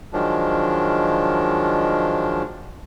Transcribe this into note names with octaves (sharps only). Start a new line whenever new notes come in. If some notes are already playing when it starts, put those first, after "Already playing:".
D#3 F3 F#3 G#3 D4